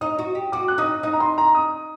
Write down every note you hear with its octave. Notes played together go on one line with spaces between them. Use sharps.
D#4 D#6
F#4
G4
F#4 D6
F#6
D#4 D#6
D#4 D#6
A#5
C6
A#5
D#6